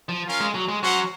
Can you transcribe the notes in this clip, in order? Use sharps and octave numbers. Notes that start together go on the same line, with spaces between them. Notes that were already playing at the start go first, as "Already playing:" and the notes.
F3
C#4 F4 A#4 F5
G#3
F#3
G#3
F#3 C#4 F#4 C5 F#5